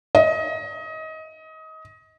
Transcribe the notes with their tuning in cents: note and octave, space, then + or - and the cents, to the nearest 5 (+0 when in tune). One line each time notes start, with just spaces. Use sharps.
D#5 +25